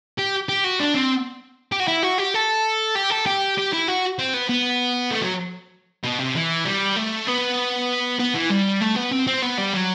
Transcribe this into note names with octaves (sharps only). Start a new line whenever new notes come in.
G4
G4
F#4
D4
C4
G4
F#4
E4
F#4
G4
A4
G4
A4
G4
G4
E4
F#4
C4
B3
B3
A3
F#3
B2
C3
E3
G3
A3
B3
B3
E3
G3
A3
B3
C4
C4
B3
G3
F#3